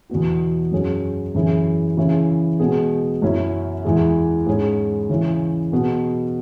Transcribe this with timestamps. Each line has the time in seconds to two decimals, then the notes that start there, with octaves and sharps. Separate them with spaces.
0.10 E2 B2 B3 F#4
0.72 F#2 F#3 C#4 G#4
1.34 F#2 E3 C#4 E4 G#4
1.97 C#3 E3 C#4 E4 G#4
2.59 B2 G#3 B3 G#4
3.22 F#2 F#3 C#4 E4
3.85 E2 E3 G#3
4.46 G#2 G#3 C#4 G#4
5.10 C#3 E3 C#4
5.72 B2 B3 G#4